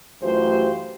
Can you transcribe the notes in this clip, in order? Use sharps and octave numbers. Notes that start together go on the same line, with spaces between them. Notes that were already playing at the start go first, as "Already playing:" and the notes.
F#2 E3 A3 F4 G4 C5